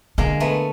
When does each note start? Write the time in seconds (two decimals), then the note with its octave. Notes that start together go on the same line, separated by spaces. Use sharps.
0.18 D3 G#3 A#3
0.40 A3 B3